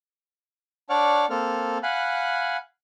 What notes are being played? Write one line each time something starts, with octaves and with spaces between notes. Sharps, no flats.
D4 C#5 D5 F#5 D6 F6
A#3 C4 A4 F6
F5 F#5 G#5 B5 F#6